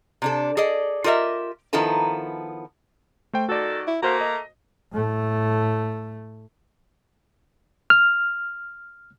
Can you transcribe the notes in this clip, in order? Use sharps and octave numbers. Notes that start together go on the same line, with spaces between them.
C3 D4 A4
G#4 A4 D5 D#5
F4 G4 A#4 D#5 E5
D#3 F3 B3 E4 A4 A#5
A3 C5 G5
D#3 F#4 A4 D5
E4
A3 A#3 F#4 C5 F5 A#5
D#5
A2 A3
F6